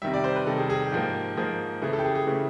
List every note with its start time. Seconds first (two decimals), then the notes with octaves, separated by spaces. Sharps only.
0.02 C3 D#3 G3 E5
0.14 D5
0.24 C5
0.36 B4
0.46 C3 D#3 G3 A4
0.58 G#4
0.70 G#4
0.80 G4
0.92 G#2 F3 A#3
1.37 G#2 F3 A#3 G#4
1.82 C#3 E3 A3 G#4
1.93 A4
1.99 G4
2.04 G#4
2.15 G#4
2.27 C#3 E3 A3